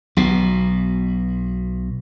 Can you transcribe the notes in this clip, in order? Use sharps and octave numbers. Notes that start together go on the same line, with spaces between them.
B1 B2